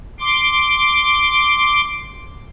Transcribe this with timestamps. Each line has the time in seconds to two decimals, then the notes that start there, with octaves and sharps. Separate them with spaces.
0.20 C6 D6